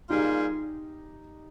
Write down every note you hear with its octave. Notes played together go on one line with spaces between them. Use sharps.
G3 A#3 D#4 F4 G4 G#4